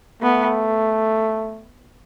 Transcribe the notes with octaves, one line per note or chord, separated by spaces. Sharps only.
A3 B3